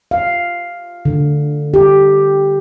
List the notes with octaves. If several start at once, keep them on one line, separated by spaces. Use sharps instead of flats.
F5
D3
G4